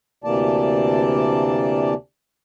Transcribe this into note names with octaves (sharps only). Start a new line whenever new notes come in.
D2 C3 E3 A#3 D5 A5